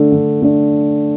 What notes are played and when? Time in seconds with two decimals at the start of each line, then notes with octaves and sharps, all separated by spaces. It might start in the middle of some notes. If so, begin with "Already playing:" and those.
Already playing: D3 A3 D4
0.12 D3
0.42 A3 D4